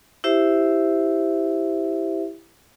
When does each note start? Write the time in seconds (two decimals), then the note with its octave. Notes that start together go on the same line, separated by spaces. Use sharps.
0.24 E4 G4 C5 E5